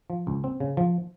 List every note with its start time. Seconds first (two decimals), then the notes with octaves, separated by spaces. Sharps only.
0.10 F3
0.27 C#2
0.44 C4
0.60 C#3
0.77 F3